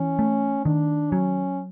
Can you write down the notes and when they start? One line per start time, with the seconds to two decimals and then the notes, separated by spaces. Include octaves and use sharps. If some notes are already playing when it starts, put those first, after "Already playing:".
Already playing: E3 C#4
0.19 A3
0.65 D#3 D4
1.12 F#3 C#4